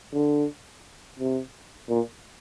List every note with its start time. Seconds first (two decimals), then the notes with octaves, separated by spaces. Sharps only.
0.13 D3
1.19 C3
1.89 A#2